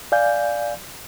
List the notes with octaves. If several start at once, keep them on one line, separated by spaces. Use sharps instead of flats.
D5 F5 G#5 G6